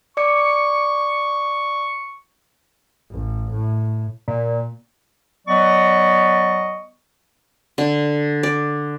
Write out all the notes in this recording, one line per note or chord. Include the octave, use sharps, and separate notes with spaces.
D5 C#6 D6 C#7
A1
A2
A#2
F#3 B3 D5 D#5 C#6
D3
D5